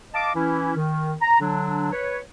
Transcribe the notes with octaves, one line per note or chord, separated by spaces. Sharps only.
D#5 F5 A5 D6
E3 C#4 E4
D#3
A#5
D3 F#3 D4
B4 C#5